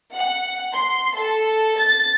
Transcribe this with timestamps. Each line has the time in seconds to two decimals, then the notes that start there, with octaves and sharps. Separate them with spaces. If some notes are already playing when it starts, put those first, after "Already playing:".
0.14 F#5
0.74 C6
1.18 A4
1.78 A6